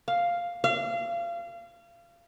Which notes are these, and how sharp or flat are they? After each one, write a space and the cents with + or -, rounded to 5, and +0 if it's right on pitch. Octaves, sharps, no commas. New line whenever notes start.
F5 +0
F5 -30